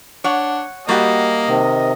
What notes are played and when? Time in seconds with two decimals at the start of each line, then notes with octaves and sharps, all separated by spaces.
0.24 D4 C#5 F#5
0.89 G3 A#3 F#4 G4 D#5
1.48 C3 D#3